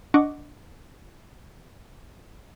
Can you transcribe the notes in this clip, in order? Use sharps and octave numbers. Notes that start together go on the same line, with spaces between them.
D4 D#5 F#5 C#6 D6